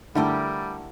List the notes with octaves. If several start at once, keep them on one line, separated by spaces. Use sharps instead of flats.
D3 G3 A3 E4 G4 A#4